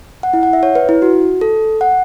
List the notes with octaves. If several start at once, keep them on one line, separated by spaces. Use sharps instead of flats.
F#5
E4
F#5
E5
C#5
B4
E4
F#4
A4
F#5